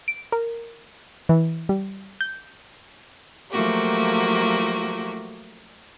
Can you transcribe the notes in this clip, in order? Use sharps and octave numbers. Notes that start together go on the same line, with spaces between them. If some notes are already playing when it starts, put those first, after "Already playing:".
D7
A#4
E3
G3
G6
F3 F#3 A3 A#3 F#4 G4